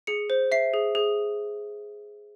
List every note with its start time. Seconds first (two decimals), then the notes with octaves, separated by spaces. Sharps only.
0.07 G#4 C#7
0.30 C5
0.52 E5 C7
0.74 G#4
0.95 G#4